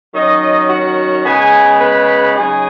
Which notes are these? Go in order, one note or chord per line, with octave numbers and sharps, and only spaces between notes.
D#3 F#3 C#4 D#4 D#5
F#4 F#5
C#3 G#3 B3 G#4 G#5
B4 B5
C#3 F#3 D#4 G#4 G#5